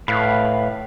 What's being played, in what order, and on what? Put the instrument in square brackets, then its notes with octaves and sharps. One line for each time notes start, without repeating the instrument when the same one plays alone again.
[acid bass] A2 [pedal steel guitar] B4 F5 B5